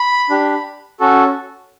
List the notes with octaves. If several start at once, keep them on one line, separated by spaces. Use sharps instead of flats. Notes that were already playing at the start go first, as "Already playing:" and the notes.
Already playing: B5
D4 G4
C#4 F#4 A4